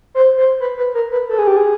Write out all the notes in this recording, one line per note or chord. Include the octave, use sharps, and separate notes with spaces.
C5
C5
B4
B4
A#4
B4
A4
G#4
G4
G#4